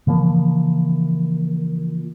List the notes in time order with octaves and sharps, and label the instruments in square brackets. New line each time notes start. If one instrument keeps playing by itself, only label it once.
[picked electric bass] C#3 E3 F3 A#3